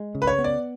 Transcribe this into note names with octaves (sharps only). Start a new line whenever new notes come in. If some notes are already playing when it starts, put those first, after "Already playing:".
Already playing: G#3
C#3
B4
C#5
B3
D5